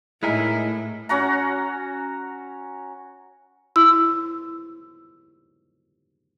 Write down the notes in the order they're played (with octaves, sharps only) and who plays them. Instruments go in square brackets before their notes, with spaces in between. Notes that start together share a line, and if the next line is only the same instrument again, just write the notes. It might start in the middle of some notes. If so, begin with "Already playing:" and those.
[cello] A2 [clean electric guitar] G#3 D#4 A#4 [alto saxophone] E4 [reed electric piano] D#5 G#5 B5
[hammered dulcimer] C#4 F#4 F#5 A#5
[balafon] E4 [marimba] E6